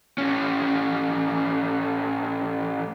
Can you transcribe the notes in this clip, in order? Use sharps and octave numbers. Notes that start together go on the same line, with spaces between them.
A2 C#4